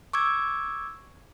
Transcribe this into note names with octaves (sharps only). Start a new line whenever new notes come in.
C#6 D6 E6 G#6